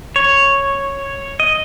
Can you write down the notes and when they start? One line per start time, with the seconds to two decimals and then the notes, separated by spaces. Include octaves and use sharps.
0.16 C#5
1.40 D#5